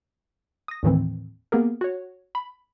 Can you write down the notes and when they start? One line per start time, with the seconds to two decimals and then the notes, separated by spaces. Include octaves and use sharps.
0.68 D#6 A#6
0.83 D#2 A2 D#3 E3 C4
1.52 A#3 B3 G4 G#4 A#4
1.81 F#4 C#5
2.35 B5